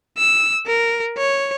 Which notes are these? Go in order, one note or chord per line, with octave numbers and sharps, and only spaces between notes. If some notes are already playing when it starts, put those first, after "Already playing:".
E6
A#4
C#5